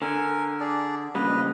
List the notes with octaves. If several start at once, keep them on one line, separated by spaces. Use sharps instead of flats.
D3 A#4 G#5
D4 G#4 D5
A#2 C#3 G3 B4 D#5